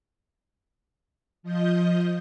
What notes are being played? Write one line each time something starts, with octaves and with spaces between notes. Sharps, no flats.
F3 D#5 G6